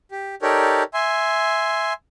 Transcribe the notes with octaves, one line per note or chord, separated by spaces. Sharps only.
G4
D#4 G4 A4 A#4 C#5 D5
E5 G#5 C6